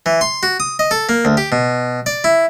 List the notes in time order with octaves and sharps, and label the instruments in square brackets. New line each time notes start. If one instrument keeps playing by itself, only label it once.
[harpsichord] E3
C6
F#4
D#6
D#5
A4
A#3
D2
G4
B2
D5
E4